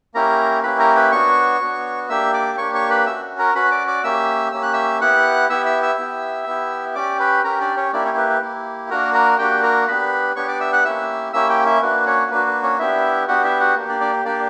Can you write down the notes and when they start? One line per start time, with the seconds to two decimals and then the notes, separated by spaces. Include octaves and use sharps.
0.14 A#3 C#4 E4 G4 A#4 A#5
0.63 A#3 C#4 E4 G4 B4 B5
0.79 A#4 A#5
0.96 B4 B5
1.12 B3 D4 F#4 C#5 C#6
1.61 B3 D4 F#4
2.09 A#3 D4 G4 E5 E6
2.33 D5 D6
2.58 A#3 D4 G4 C#5 C#6
2.74 C#5 C#6
2.90 B4 B5
3.07 C#4 F#4 E5 E6
3.39 A#4 A#5
3.55 C#4 F#4 B4 B5
3.71 D5 D6
3.87 D5 D6
4.04 A#3 C#4 G4 E5 E6
4.52 A#3 C#4 G4 E6
4.63 F#6
4.73 E5 E6
5.01 B3 E4 G4 F#5 F#6
5.50 B3 E4 G4 E5 E6
5.66 E5 E6
5.83 E5 E6
5.99 B3 E4 G4
6.47 B3 E4 G4
6.95 C#4 G4 D5 D6
7.20 B4 B5
7.44 C#4 G4 A#4 A#5
7.60 D4 D5
7.77 C#4 C#5
7.93 A#3 D4 E4 G4 D5
8.05 C#4 C#5
8.17 B4
8.30 B4
8.41 A#3 E4 G4
8.90 A#3 D4 F#4 A#4 A#5
9.14 A#4 A#5
9.38 A#3 D4 F#4 G4 G5
9.63 A#4 A#5
9.88 B3 D4 G4 B4 B5
10.36 B3 D4 G4 C#5 C#6
10.48 D5 D6
10.60 E5 E6
10.73 F#5 F#6
10.85 A#3 C#4 E4 G4 E5 E6
11.33 A#3 C#4 E4 G4 E5 E6
11.49 G4 G5
11.66 E4 E5
11.82 A#3 D4 F#4 B4
12.06 C#4 C#5
12.31 A#3 D4 F#4 B4
12.46 B4
12.63 C#4 C#5
12.79 B3 D4 E4 G4 E5
13.28 B3 D4 F#4 G4 F#5
13.44 E4 E5
13.60 F#4 F#5
13.76 A#3 D4 G4
13.89 D4 D5
14.01 D4 D5
14.25 A#3 D4 G4 D5